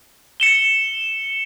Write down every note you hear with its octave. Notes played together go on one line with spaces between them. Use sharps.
C#7 E7 G7